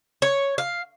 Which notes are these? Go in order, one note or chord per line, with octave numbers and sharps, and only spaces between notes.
C#5
F5